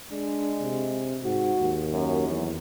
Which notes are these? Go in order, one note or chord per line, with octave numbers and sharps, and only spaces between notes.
G#3 D4
C3
G#2 F#4
D#2
F#2
E2 F#3